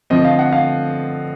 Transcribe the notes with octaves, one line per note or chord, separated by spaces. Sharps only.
D3 F3 A3 C4 D#5
F5
F#5
F5